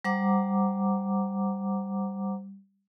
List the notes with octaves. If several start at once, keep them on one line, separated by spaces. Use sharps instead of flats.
G3 C5 F#5 A#5 D6